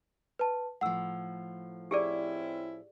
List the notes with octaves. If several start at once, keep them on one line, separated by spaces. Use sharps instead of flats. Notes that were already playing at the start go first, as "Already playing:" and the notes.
B4 A5
A2 F3 F#5 E6
C4 C#4 E4 G4 G#4 D5